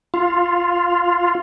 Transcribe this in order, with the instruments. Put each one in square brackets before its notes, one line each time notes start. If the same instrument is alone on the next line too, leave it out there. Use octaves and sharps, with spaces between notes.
[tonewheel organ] F4